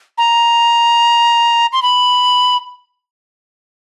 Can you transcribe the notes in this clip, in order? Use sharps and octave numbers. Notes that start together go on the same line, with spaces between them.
A#5
C6
B5